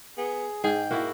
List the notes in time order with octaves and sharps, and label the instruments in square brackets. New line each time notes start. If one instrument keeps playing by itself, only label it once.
[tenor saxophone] B3 [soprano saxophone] G#4
[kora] G#2 [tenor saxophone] G#4 [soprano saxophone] G5
[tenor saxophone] A#3 [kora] E4 F#4